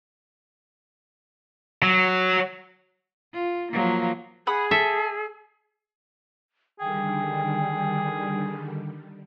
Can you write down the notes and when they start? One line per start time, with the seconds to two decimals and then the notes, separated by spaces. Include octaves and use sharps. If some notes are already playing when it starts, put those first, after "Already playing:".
1.83 F#3
3.34 F4
3.72 F3 F#3 A#3
4.47 G#4 F#5 B5 D#6
4.71 A4 E5
6.80 D3 D#3 G3 G#4 G5